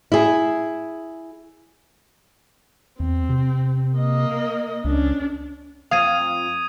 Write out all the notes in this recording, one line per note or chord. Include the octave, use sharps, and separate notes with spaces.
E4 G#4
E2 C4
C3
A#3 D#5
C#2 C#4 D4
F2 F3 F5 D#6 G#6 D#7